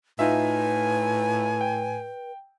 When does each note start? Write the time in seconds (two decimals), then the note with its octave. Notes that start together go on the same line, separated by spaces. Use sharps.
0.19 A2 D#4 F4 B4 E5 G#5
1.61 G5